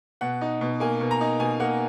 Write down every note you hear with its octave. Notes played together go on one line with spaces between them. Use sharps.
B2 F#5
D#4
B2
A#3 G#5
B2
A#5
D#4
B2 G#5
A#3 F#5